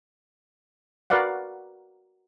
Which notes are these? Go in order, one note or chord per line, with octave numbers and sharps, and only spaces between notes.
F#4 A#4 B4 D5 F5 F#5